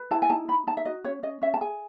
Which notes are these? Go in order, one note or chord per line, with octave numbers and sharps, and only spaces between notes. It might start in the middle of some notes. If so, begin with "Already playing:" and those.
Already playing: B4
E4 A5
G#5
D#4 A5
D#4 B5
D#4 A5
E5
F#4 D#5
C#4 C#5
C#4 D#5
C#4 E5
A5
G#4 G#5